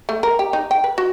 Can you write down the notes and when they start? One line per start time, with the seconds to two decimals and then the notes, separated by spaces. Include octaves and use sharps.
0.09 A3
0.23 A#4
0.39 G4
0.53 D#4
0.71 G5
0.84 B4
0.98 F#4